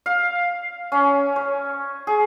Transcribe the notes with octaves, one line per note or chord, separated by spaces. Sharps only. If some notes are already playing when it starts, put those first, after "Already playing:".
F5
C#4
C#5
G#4